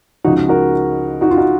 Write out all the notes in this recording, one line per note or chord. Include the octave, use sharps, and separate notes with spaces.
C#2 C#3 F3 D#4 F#4
F#4 A#4
D#4 F#4
F4
D#4 F#4